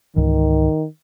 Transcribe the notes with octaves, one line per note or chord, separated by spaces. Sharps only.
C#2 G#2 D#3 E3